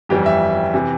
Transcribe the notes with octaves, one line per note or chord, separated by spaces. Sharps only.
G1 F2 E3 G3 G4
E5
C3 E3